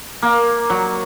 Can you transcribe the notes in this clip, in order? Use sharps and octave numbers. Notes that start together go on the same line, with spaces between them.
A#3
F#3